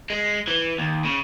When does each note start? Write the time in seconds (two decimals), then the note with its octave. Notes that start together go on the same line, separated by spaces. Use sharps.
0.10 G#3
0.48 E3
0.78 D#2
1.05 C#3